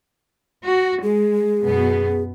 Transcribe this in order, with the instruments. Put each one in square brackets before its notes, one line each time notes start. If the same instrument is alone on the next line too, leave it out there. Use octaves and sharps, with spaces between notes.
[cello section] F#4
[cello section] G#3 [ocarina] G#4
[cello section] F#2 B2 B3